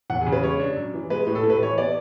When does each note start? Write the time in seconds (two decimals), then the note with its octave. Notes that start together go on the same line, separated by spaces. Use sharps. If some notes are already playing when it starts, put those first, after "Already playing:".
0.10 E2 F#5
0.21 G#4
0.26 C#3
0.32 B4
0.43 G#3 C#5
0.60 D4
0.76 F#2
0.94 E3
1.10 G#3 B4
1.27 A2
1.35 A4
1.43 A2
1.50 B4
1.61 E3 C#5
1.77 B3 D5